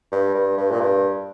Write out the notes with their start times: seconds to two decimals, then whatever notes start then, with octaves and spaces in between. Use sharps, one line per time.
0.12 G2
0.34 G2
0.57 G2
0.71 A#2
0.81 G2